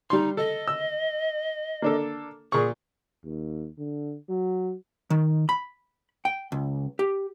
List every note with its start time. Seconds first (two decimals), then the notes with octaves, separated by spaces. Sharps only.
0.10 G3 D#4 C6
0.37 A4 D#5
0.68 E6
1.82 A#3 D4 A4
2.52 A#2 G#4 C#6
3.25 D#2
3.78 D3
4.29 F#3
5.10 D#3
5.49 B5
6.25 G5
6.52 C#2
6.99 G4